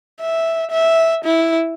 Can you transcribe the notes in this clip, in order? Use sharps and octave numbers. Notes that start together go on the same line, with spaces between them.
E5
E5
E4